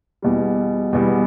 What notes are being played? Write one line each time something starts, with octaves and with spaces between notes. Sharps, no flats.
E2 B2 G3
E2 B2 G3